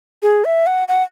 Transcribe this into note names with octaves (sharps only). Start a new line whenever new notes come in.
G#4
E5
F#5
F#5